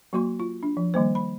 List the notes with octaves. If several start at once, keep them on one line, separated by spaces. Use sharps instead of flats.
F#3 A#3 F#4 C6
F4
D4
F3
D#3 G3 A#3 C5
B5